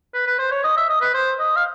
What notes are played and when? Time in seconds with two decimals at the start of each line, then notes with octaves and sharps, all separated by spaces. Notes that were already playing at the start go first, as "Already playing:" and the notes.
0.14 B4
0.27 B4
0.39 C5
0.51 C#5
0.64 D#5
0.77 E5
0.89 D#5
1.01 B4
1.14 C5
1.39 D#5
1.56 F5